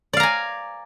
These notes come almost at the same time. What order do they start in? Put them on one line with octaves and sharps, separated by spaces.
D5 F5 A#5 G#5